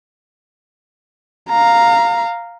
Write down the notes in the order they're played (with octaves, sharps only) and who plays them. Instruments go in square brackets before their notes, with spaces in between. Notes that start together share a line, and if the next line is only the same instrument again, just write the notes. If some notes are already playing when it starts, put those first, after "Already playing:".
[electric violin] F5 A#5